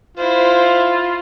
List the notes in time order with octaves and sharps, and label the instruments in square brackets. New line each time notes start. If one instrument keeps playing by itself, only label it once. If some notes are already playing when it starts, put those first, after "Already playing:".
[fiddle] E4 C5 [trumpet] F4